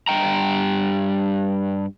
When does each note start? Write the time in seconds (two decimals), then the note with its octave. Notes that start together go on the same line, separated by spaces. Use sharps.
0.08 G2 G5 A#5